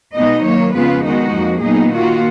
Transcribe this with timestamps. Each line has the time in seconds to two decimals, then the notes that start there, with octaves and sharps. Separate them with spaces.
0.15 B2 G#3 B3 D#4 D#5
0.44 D#3 F#3 A#3 C#5
0.74 F2 C#3 G#3 B3 F4 B4
1.04 D#3 G#3 B3 D#4 F#4
1.34 F2 F3 A#3
1.63 A#2 F#3 B3 D#4 G#4
1.92 D#3 A#3 F4 F#4